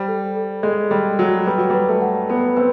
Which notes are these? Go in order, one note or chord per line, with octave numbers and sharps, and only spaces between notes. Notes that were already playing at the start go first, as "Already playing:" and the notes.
Already playing: G3 C5
A4
A4
G#3 A4
G3 A4
F#3 A4
G3 B4
F#3
G3 B4
A3
F#5
B3 B4
C4 B4